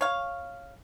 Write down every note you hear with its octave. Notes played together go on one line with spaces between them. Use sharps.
C#5 F5